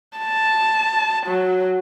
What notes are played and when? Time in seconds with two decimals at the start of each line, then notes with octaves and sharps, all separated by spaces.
0.18 A5
1.26 F#3